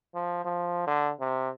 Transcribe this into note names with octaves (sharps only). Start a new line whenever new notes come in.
F3
F3
D3
C3